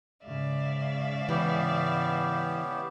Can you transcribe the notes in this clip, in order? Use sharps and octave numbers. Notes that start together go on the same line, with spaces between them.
G#2 C#3 D5 E5 F5
E3 B3 C#4 G4